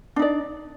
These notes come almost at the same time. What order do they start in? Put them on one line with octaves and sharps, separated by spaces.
D4 D#4 D5